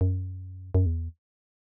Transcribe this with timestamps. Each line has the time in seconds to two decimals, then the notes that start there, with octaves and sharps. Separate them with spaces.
0.01 F#2
0.75 F#2
0.86 E2